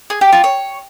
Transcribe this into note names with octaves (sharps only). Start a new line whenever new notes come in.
G#4
G4
F4
C#5